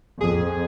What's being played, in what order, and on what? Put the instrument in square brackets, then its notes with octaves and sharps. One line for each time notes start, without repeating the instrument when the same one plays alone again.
[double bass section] F2 [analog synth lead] G#4